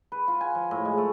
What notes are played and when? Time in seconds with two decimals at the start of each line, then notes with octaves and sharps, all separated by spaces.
0.12 B4
0.28 F4
0.41 G#5
0.55 F3
0.71 A2
0.85 G#3
0.98 A3